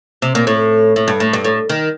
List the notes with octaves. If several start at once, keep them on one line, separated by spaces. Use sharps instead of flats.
C3
A#2
A2
A2
G2
A2
G2
A2
D#3